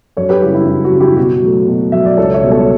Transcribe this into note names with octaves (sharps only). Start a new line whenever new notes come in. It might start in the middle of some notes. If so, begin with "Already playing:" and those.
F#2 A4 C#5
G4 B4
C#3 G3 E4 G4
E4
F#2 E4
F#4
C#3 G3
E4 G4
B2 F#4
F#3 A3
B2
F#3 A3 E5
D5
C#2 A4 C#5
C#5 E5
B2 G3 B3
A4 C#5